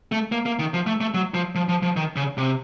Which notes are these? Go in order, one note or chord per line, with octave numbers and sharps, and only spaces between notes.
A3
A#3
A#3
D#3
F3
A3
A3
F#3
F3
F3
F3
F3
D#3
C#3
C3